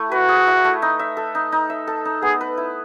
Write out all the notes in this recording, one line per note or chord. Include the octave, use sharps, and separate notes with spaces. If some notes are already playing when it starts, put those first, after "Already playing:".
Already playing: A3 E4
F#4 B4
G#4
E4
A3
D#4
E5
A4
D#4
D#4
E5
A4
D#4
B3 G#4
B4
E4